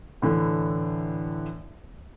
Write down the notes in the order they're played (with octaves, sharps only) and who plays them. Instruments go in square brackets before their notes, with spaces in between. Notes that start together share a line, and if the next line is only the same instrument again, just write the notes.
[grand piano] A2 D3 E3